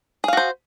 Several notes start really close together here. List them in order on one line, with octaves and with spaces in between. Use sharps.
G#4 F5 F#4 C5